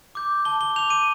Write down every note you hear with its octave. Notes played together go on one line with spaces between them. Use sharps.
D6 G6
A5 G7
G7
D6 G6 F7
D#7